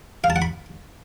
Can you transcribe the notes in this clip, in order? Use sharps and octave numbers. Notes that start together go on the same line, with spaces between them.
F5
A5
F#5
B5